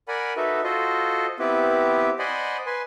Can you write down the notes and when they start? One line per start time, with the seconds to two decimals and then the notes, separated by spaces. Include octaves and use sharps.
0.08 A#4 D5 F#5 G#5 B5
0.37 D#4 F#4 A4 B4 E5
0.64 F4 F#4 A4 C5 D#5
1.39 B3 C4 E4 G4 B4
2.19 C5 D5 D#5 F#5 G#5 B5
2.66 B4 G#5 C6